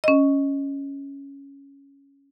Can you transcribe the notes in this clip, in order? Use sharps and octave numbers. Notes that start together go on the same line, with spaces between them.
C#4 D#5